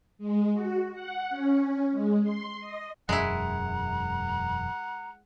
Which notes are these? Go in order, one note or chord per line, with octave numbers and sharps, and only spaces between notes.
G#3
F#4
F#5
C#4
G#3
C6
D#5
E1 F#2 G#3 E4 F#5 A#5